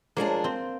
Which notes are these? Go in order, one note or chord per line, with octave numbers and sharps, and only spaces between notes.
F3 G#3 A#3 D4 G#4
C4